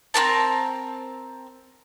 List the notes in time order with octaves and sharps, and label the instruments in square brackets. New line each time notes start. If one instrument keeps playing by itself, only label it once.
[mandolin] C4 C#4 A#4 A5